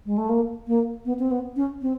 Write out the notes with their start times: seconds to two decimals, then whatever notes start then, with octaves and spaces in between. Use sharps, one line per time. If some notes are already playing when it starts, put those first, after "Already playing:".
0.06 G#3
0.18 A3
0.29 A#3
0.67 A#3
1.05 B3
1.19 C4
1.31 B3
1.56 C#4
1.82 C4